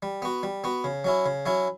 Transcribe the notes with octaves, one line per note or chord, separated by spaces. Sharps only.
G3
B3 F#4
G3
B3 F#4
C#3
F#3 C#4 E4
C#3
F#3 C#4 E4